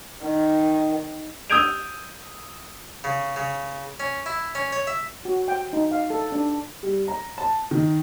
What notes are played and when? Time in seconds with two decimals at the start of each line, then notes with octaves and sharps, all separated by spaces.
0.23 D#3
1.50 D#6 E6 G6 G#6 D7 F7
3.04 C#3
3.36 C#3
4.00 C#4
4.26 E4
4.55 C#4
4.72 C#5
4.87 E5
5.25 F#4
5.48 G5
5.73 D#4
5.91 F5
6.10 A4
6.32 D4
6.83 G3
7.08 A#5
7.38 A5
7.71 D#3